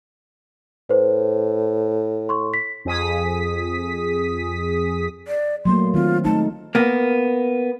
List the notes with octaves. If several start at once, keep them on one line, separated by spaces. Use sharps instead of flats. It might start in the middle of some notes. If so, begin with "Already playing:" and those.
A2 B4 C5
C6 C#6
B6
F2 G#4 D#6 B6
D5
F#3 A3 A#3 C6
D#3 C4 F4
G#3 A3 D#4 A5
A#3 B3